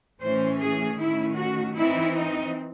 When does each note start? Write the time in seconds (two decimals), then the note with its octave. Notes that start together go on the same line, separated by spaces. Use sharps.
0.21 A2 E3 A3 C#4 C5
0.60 G#4
0.99 D#3 A3 C#4 E4
1.37 F#4
1.76 E3 C4 D#4 E4
2.15 D#4